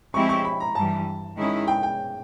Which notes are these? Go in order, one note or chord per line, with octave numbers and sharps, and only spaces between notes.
F3 G#3 C4 E4 G4 C#6
C#6
B5
A#5
G2 E3 G3 A5
D#3 G#3 C#4 E4 G#4
G5
G5